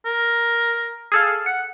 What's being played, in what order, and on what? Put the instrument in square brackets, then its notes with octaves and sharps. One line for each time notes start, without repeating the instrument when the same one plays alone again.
[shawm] A#4
[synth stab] G#4 A4 F5
[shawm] F#5 [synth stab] C#7